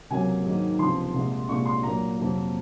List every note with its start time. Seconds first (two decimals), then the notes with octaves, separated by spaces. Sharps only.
0.10 C#2 C3 F#3 A#3 G#5
0.44 G#2 D#3 F#3 A#3
0.79 C#2 C3 F3 C6
1.14 C2 A#2 G#3
1.49 C2 A#2 G#3 C#6
1.66 C6
1.83 A#2 F#3 A#3 A#5
2.17 F2 C3 F#3 A#3